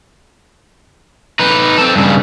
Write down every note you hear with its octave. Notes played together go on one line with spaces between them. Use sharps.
D#4 B4
C4 A4
G2 C#3